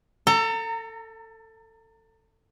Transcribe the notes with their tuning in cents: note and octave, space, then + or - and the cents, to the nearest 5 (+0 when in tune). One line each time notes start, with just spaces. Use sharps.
A4 +20 A#5 -25